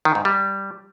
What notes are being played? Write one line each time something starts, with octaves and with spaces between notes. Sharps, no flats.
D#3
G#2
G3